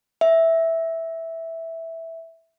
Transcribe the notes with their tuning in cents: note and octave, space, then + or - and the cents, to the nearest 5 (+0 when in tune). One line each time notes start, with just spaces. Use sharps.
E5 -5